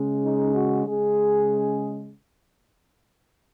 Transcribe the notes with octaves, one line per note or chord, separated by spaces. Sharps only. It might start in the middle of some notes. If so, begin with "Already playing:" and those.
Already playing: C#3 G#3
D#4
F#4
C#3 G#3 G#4